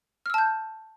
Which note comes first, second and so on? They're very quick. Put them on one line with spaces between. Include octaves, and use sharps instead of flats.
F6 E6 A5 G6